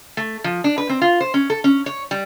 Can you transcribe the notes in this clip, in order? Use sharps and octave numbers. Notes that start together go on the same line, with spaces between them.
A3
F3
D4
B4
C4
F4
C5
C#4
A4
C#4
C#5
G3